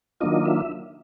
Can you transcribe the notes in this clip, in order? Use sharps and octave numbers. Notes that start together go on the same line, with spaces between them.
D#3 F#3 A#3 D4 F4 D#5
E5